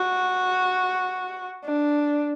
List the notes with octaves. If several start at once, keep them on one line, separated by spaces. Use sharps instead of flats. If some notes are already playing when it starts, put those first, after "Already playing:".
Already playing: F#4
D4